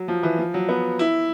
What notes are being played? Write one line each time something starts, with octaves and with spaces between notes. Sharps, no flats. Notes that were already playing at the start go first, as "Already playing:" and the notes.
Already playing: F#3
F3
E3
F3
F#3
B3
E4